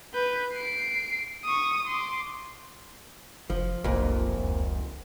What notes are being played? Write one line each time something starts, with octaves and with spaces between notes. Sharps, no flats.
B4 G6
C7 D7
C#6 D#6
C6 D6
F1 F3
F1 B1 F2 A#2
C#2